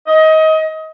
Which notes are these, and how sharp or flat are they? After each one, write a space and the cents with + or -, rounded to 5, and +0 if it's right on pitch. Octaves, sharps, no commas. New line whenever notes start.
D#5 +25